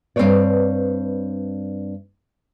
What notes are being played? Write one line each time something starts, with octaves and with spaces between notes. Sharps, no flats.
G2 C4 G#4 B4 C#5 D5